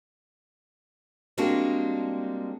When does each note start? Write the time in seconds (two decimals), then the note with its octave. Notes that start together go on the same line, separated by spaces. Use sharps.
1.38 G3 G#3 A#3 C4 D4 F#4